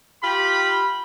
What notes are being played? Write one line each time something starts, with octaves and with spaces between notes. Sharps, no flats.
F4 G4 B5